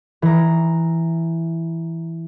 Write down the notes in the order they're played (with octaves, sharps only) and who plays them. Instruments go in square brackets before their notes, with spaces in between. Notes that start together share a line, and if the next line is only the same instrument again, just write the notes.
[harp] E3 A#5